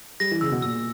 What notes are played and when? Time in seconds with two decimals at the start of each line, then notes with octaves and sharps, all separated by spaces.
0.20 G3 A#6
0.31 E3
0.41 C#3 E6
0.51 B2
0.62 A#2 E6